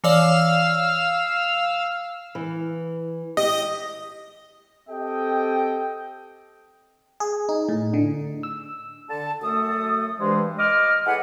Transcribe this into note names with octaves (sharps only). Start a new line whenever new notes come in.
E3 C#5 D5 F5 E6 F6
E3
G4 D#5
C4 G4 A4 D#5 G5
G#4
D#4
A2
D3
E6
D3 A5
F#2 A3 A4 D#6
G2 E3 G#3 C5
D#5 D6 F6
E4 G#4 A4 B4 C#5 F#5